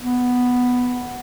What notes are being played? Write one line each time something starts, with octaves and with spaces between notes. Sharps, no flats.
B3